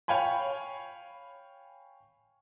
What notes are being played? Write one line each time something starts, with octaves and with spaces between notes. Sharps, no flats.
C#5 F5 G5 G#5 B5